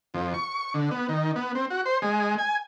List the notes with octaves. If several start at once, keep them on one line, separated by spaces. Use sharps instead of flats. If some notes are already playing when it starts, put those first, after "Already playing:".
F2
C#6
D3
B3
D#3
B3
C4
F#4
C5
G#3
G#5